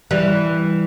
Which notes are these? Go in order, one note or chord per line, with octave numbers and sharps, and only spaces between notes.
E3 G3